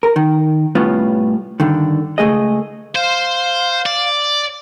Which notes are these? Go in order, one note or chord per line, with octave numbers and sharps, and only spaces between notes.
A#4
D#3
A2 C3 G3 B3 C#4 F4
G2 D3 D#3
C#2 A3 G#4 D#5
C5 F5
D5